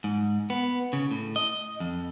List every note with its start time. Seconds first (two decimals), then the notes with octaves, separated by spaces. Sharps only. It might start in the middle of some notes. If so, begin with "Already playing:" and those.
0.04 G#2
0.50 B3
0.93 C#3
1.11 A2
1.36 D#5
1.80 F2